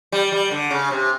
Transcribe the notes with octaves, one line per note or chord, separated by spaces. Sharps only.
G3
G3
D3
C#3
C3